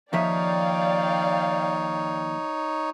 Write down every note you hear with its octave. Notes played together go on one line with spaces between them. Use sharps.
D#2 F3 D#4 C#5 D5 E5 F5 G5